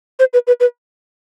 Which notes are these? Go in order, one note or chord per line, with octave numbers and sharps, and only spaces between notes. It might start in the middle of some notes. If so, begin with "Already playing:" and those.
C5
B4
B4
B4